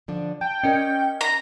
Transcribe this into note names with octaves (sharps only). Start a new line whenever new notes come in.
D3 F3 D4
G5 A5
C#4 A#4 D5 D#5
A#5